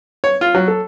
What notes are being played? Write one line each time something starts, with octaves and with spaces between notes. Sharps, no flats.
C#5
F4
F#3
A4